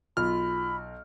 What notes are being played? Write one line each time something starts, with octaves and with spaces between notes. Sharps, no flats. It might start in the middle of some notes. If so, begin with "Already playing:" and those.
B1 F4 B5 F6